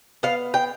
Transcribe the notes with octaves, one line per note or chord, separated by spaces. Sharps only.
B3 F5
G5